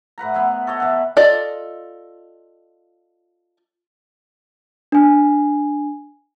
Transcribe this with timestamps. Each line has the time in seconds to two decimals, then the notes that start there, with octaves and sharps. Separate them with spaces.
0.18 A2 B4 F#5 A#5
0.34 B3 E4 B4 C5
0.67 A4 C#5 D#5 F#5
0.80 B2 E3 A4 F#5
1.17 F4 A4 D5 D#5
4.92 D4 G#5